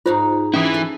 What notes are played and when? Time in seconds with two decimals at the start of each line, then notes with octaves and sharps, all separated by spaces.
0.06 G#2 D#4 F4 F#4 C5
0.54 E3 C#4 E4 D#6
0.74 A4